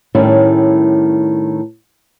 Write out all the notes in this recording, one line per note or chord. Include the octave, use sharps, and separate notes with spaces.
A2 D#3 G3 C#4 E4